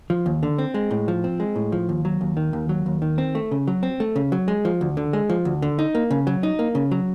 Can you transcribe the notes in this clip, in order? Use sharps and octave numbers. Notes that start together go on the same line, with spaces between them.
F3
D#2
D3
C4
G#3
A2
F3
C4
G#3
A2
F3
D#2
F#3
D#2
D#3
D#2
F#3
D#2
D#3
C4
A3
C#3
F#3
C4
A3
C#3
F#3
G#3
F3
D2
D3
G#3
F3
D2
D3
D#4
A#3
C#3
F#3
D#4
A#3
C#3
F#3